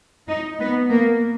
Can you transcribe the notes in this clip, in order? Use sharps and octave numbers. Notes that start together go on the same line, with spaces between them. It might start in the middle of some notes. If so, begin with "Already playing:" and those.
D#4
B3
A#3